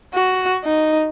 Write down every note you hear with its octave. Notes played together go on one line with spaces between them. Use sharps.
F#4
D#4